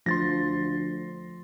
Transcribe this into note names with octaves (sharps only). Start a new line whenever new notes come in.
D2 F3 C6 A6 A#6